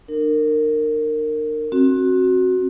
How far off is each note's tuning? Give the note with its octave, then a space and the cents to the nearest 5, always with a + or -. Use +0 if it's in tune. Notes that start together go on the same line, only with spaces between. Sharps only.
D4 +45 A#4 -20
C4 +30 F#4 +0